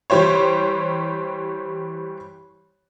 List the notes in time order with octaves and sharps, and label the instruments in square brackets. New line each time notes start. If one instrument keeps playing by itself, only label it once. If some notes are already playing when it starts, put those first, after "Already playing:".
[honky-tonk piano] E3 G3 G4 C5 C#5